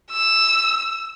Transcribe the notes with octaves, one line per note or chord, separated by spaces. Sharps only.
E6